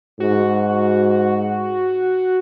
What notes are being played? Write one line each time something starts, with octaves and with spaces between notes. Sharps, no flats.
G#2 F#4